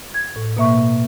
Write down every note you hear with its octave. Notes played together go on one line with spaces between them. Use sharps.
G#6
A2
B2 A#3 E5 C#6